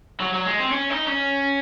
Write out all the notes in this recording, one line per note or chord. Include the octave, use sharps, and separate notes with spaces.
F#3
F#3
G#3
C4
C#4
D#4
C#4